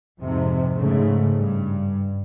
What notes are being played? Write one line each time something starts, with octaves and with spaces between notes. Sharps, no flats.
F2 G#2 C3
G#2 C#3 A3
G2